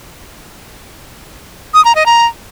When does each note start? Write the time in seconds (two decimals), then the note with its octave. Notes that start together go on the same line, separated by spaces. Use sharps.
1.74 D#6
1.85 A#5
1.95 D#5
2.06 A#5